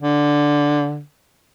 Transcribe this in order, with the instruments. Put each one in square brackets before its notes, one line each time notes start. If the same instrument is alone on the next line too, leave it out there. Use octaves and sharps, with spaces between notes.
[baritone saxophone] D3